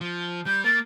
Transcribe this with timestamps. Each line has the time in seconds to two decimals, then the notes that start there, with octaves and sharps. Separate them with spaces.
0.01 F3
0.46 G3 G6
0.64 A#3 A6